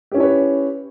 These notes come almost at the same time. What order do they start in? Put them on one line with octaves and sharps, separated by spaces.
G4 C#4 E4 C#5 B4